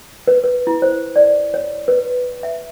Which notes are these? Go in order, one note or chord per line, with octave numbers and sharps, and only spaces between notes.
B4
B4
E4
C5
D5
C#5
B4
E5